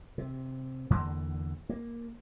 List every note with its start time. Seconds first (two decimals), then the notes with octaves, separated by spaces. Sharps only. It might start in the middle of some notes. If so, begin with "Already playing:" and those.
0.18 C3
0.90 E2 D3 E3 A#3
1.69 A#3